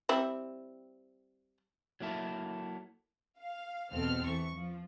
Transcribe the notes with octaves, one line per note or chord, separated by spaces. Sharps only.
G3 C4 E4
F#3 A#3 E4 A4
F5
E2 B2 C4 A4 F6
E3 C#6
F3